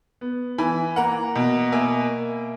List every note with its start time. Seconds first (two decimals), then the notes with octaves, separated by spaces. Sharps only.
0.21 B3
0.58 E3 G#5 B5
0.96 A#3 F#5 A#5
1.35 B2
1.72 A#3 E5 G#5